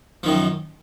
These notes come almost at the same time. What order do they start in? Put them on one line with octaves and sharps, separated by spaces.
F3 D#3 F#2